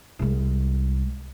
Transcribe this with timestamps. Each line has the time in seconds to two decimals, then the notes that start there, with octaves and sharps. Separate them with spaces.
0.19 C2 G#3